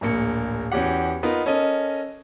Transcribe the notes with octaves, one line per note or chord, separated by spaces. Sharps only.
D1 A#1 A#3 C#7
E2 C#4 F#4 G4 F#5
B3 D#4 F4 A#4
C#4 A4 A#4 D#5